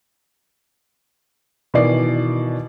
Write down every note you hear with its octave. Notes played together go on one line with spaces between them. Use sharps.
B2 D#3 E3 D5 C7